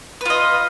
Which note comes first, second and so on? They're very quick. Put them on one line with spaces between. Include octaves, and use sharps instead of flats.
B4 F4 D#5